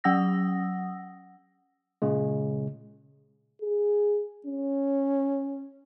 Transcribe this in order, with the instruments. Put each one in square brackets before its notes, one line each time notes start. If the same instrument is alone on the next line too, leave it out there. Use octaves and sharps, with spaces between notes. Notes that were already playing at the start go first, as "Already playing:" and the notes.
[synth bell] F#3 C#4 F#5 D#6 E6 A#6
[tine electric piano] A#2 C#3 G#3
[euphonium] G#4
C#4